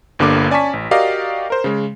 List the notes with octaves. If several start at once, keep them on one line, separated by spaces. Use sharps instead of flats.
G1 G2 D3 A#3 D6
C#4 D5 G#5 A5 C#6 B6
A1
F#4 G4 A#4 D5 D#5 F5
A#4 C5
C#3 G#3